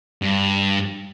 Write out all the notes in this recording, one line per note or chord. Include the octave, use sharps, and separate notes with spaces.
G2